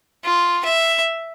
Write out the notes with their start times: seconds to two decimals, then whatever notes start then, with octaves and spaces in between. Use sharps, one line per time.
0.24 F4
0.64 E5